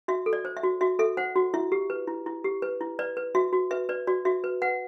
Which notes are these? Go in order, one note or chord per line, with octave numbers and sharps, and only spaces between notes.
F#4 E5
A4
D5
C5
E5
F#4
F#4 E5
A4 E5
C5 F#5
F#4
E4 E5
G4
B4
E4
E4
G4
B4
E4
B4 D5
B4
F#4 E5
F#4
B4 E5
B4 D5
F#4 D5
F#4 E5
B4
B4 F#5